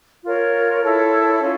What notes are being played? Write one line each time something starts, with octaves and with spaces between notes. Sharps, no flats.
F4 A#4 C#5
E4 A4 C#5
C#4 F4